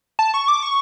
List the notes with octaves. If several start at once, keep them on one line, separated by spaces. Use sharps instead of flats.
A5
C#6
D6
C#6